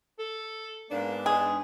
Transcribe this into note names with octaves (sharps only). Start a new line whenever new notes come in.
A4
G#2 A#3 B3 D4
G#3 G#4